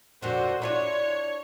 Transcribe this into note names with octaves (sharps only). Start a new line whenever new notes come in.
F2 A#2 D3 F#4 C5
D4 E4 F4 C#5